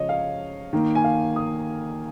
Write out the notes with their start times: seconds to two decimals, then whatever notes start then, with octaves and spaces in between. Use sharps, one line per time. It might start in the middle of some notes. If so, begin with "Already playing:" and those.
Already playing: C#3 F3 G#3 C#5 D#5
0.09 F5
0.73 D#3 A#3
0.95 G#5
1.04 F5
1.36 D#6